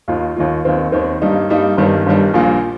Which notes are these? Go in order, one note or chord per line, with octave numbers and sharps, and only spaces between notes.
D#2 D#3 A#3 F4
D#2 D#3 A#3 F4
D#2 D#3 C4
D#2 D#3 C4
G2 G3 A#3 D#4
G2 G3 A#3 D#4
G1 G2 D#3 G3
G1 G2 D#3 G3
A#1 A#2 A#3 F4